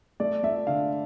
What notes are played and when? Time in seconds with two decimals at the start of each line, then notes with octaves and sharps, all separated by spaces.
0.20 A3 D5
0.43 A3 E5
0.67 D3 F5